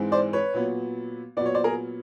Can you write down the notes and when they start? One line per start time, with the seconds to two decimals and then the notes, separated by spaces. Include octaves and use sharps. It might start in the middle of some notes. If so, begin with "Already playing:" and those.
Already playing: G#2 E3 G#3 C4
0.12 C5 D5
0.33 B4 C#5
0.54 A#2 F#3 B3
1.37 A#2 F#3 B3 D5
1.46 C#5
1.54 C5 D5
1.64 G#4 A#4